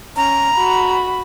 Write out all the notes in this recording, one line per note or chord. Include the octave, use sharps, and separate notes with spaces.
C#4 A#5
F#4 B5